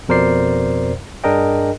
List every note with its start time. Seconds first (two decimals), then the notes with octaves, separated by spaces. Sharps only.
0.09 F2 B2 A#4 C5 D5 C7
1.24 G2 D4 G#4 A#4 D#5 G5